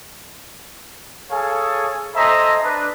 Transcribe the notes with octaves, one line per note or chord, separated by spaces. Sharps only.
G#4 A4 C#5 F5 G#5
A4 C5 D#5 E5 G#5 A#5
D4 B4